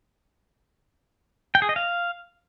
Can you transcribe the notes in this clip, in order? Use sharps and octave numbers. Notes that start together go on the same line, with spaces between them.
G5
G#4
D#5
F5